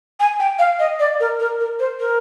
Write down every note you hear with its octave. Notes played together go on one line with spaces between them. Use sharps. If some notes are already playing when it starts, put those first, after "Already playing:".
G#5
G5
F5
D#5
D5
A#4
A#4
A#4
C5
A#4